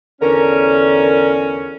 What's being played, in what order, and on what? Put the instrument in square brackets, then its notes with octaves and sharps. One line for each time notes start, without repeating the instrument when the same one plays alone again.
[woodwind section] E2 D3 [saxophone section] C#4 [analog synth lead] A#4